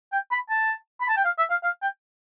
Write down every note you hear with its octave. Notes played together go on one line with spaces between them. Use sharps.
G5
B5
A5
B5
A5
G5
F5
E5
F5
F5
G5